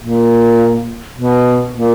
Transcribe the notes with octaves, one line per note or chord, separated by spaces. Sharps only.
A#2
B2
A#2